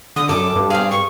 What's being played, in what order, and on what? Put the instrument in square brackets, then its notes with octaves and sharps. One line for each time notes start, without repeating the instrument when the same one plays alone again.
[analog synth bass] D3 [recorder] D#6
[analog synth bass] F#2 [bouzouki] A4 [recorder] D6
[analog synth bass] G2
[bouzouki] C4 G#4 [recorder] F5
[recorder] C#6